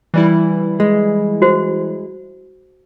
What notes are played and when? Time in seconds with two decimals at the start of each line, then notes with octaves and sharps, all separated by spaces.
0.14 E3 G3 E4
0.80 G#3
1.42 F#4 C5